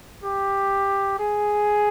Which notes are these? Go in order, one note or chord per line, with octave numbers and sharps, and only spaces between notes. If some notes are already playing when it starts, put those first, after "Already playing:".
G4
G#4